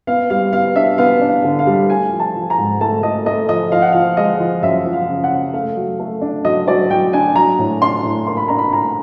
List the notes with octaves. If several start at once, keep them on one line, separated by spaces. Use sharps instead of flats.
B3 F5
G3 F5
B3 F5
D4 E5
B3 F5
D4
F5
D3
F5
G3
A3 G#5
F3
A5
F3
A#5
G#2
A3 A5
A3 D#5
A3 D#5
F3 D#5
F3 F5
F#5
F3 F5
G#3 D#5
F3
F#2 E5
F3
F5
C#3
F#5
C#3
A3 F5
F#3
A3
D4
F#3 D#5
F#3 D5
F#3 G5
D4 G#5
F#3 A#5
A2
D4 C6
A2
A#3 C6
B5
D4 A#5
B5
A2 A#5